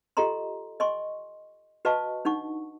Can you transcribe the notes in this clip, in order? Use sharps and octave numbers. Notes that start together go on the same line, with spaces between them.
F4 G4 A4 D#5 A#5 C6
D#5 G#5 C6 C#6
F#4 B4 D#5 F5 A5 C#6
D4 D#4 F#5 C#6